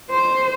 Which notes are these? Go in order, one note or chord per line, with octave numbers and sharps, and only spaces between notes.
C5